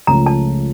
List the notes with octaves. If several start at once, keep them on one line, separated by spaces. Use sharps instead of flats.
C#2 C#3 F3 A3 C#4 A#5
A5